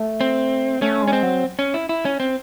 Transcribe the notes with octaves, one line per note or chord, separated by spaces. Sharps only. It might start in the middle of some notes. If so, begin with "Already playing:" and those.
Already playing: A3
C4
A3 C#4
G#3
C#4
C4
F#3
C#4
E4
E4
C#4
C4